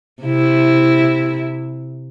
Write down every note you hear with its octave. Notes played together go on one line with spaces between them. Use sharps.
C3 E4